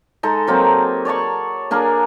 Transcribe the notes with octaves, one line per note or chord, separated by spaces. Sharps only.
G#3 D#4 A4
F#3 A#3 C4 D#4
C#5 D5 A5 C#6
A#3 D4 G#4 A#4